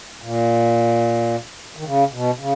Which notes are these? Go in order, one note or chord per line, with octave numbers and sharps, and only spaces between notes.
A#2
D#3
C#3
B2
C#3